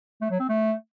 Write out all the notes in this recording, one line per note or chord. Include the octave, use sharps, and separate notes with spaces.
A3
F#3
C4
A3